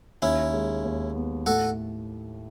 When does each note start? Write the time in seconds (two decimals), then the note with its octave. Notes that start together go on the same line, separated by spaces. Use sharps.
0.22 D#2 C#4 E4
0.53 G#3
0.84 D#2
1.15 B3
1.46 A2 F#4 A4